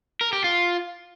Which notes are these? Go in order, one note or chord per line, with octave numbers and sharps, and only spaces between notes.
A#4
G4
F4